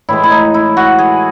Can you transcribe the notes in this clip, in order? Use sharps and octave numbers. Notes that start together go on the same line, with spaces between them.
A2 E3 G#3 E4
E4
D#4
E4
F#4
G#4